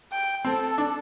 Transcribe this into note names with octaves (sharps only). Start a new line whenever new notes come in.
G5
C4 A4
D4